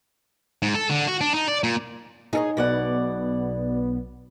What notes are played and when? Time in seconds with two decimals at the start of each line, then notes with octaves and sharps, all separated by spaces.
0.62 G#2
0.75 A4
0.90 D3
1.08 F#4
1.21 D4
1.34 D#4
1.48 D5
1.64 A#2
2.33 D#4 G#4 A4 C#5
2.57 B1 B2 B3 D5 F#5